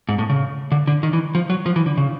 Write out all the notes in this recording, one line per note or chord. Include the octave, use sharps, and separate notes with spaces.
G#2
A2
C#3
D3
D3
D#3
E3
F3
F#3
F3
E3
D3
C#3